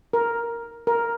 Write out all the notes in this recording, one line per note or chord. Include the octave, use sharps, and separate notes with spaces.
A#4
A#4